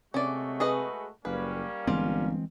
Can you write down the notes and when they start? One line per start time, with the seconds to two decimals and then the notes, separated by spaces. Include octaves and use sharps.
0.14 C3 G#3 A3 C#4 F#4 D5
0.60 G#4 B4 D#5
1.25 F#1 G3 A#3 C#4 B4
1.87 G1 E3 G#3 C4 F4